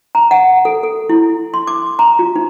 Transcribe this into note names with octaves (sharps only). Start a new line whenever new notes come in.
A#5
F#5
A4
A4
E4
C6
D6
A#5
F4
D#4